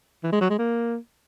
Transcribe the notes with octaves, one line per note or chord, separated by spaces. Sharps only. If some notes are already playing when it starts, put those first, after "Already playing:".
E3
G#3
F#3
G#3
A#3